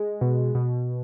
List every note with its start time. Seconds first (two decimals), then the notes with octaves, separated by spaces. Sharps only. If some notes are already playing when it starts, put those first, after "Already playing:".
Already playing: G#3
0.21 B2
0.55 B2